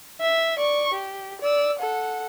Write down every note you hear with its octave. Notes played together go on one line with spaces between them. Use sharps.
E5
D5 C#6
G4
D5 E6
A4 F#5